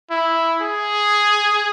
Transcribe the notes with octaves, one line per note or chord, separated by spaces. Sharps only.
E4
G#4